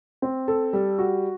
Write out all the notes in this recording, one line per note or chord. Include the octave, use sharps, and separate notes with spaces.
C4
A4
G3
F#4